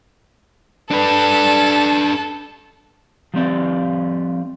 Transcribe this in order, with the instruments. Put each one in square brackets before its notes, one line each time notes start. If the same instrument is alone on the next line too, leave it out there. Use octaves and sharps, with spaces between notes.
[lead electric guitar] D4 B4 [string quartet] A4
[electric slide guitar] F3 G3 C4 D5